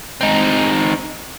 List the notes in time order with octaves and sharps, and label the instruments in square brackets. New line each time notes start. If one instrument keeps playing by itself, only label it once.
[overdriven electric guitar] C4 D#4